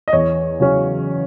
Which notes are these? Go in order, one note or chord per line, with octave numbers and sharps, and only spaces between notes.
D#5
E2 C#5
C#3 F#3 C#4